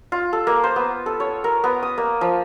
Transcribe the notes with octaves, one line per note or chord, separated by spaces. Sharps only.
F4
A4
A#3
C5
B3
A4
C#5
A#4
B3
D#6
A#3
F3